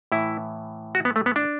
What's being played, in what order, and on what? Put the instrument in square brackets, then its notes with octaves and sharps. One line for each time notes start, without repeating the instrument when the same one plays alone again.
[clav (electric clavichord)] A2 E3 E4
F#4
B3
A3
B3
D4